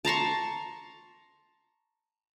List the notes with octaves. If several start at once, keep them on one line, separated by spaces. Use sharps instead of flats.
A5 A#5 C6 C#6